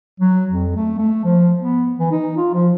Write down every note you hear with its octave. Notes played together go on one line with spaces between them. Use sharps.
F#3
F2
A3
A3
F3
B3
E3
D#4
F4
F3